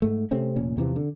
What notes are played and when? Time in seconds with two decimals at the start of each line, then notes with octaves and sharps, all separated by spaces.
0.02 G#2 A3
0.31 C3 A3 C4 C#4
0.56 F1 A#2 C#4
0.77 E2 C3 E3 F3
0.96 D3